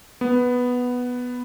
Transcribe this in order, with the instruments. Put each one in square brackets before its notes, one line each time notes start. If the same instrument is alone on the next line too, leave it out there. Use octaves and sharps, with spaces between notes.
[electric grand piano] B3